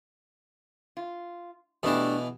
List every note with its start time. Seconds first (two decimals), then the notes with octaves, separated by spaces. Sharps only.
0.97 F4
1.83 B2 E3 A3 D4 G4